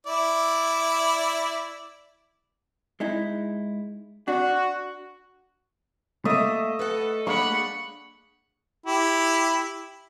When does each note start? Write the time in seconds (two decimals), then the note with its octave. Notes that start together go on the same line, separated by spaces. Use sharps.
0.07 E4 D5
3.00 G#3 D#4 E4
4.28 D4 F#4
6.25 A3 A#3 D#5 E5
6.79 A4 B4 F#5
7.27 A#3 D4 G#4 F#5 B5 C#6
8.86 E4 G4